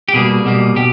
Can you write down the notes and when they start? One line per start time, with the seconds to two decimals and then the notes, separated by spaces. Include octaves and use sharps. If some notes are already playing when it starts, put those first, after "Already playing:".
0.09 G4
0.14 B2 G3 A#3 G#4
0.45 B2 G3 A#3
0.76 B2 G4